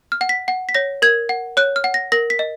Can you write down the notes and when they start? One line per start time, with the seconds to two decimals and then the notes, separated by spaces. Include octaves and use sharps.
0.12 F6
0.21 F#5
0.29 B6
0.48 F#5
0.69 B6
0.75 C#5 A#6
1.02 A#4 G#6
1.29 F#5
1.57 C#5 F#6
1.76 F6
1.84 F#5
1.94 A#6
2.12 A#4 A#6
2.30 B6
2.39 D#5